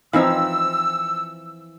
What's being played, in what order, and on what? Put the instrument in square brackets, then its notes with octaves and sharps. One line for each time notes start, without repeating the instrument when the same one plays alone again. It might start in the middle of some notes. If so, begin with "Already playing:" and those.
[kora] E3 F3 [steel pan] C4 D#4 F5 [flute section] E6